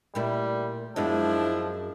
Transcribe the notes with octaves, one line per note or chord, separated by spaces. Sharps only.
A#2 G3 A3 E4
F#2 F3 G#3 B3 D4 E4